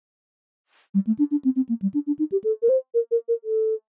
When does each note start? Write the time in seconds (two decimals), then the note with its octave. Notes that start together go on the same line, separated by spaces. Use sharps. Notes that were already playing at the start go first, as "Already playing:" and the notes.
0.94 G3
1.07 A3
1.19 D4
1.31 D4
1.45 C4
1.56 C4
1.69 A#3
1.82 G3
1.94 D4
2.07 D4
2.19 D#4
2.32 G4
2.44 A4
2.63 A#4
2.69 C5
2.94 A#4
3.11 A#4
3.28 A#4
3.44 A4